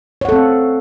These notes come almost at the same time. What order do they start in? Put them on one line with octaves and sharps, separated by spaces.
C#5 F#5 A4 C4 F5